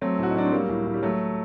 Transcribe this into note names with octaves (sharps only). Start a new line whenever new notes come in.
F#3 A3 C4
A2 F#4
D#4
F#3 D4
C4
F#3 G3 A#3
A2
A2
G3
F#3 A3